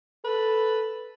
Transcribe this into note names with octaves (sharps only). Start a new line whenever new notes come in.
A4 B4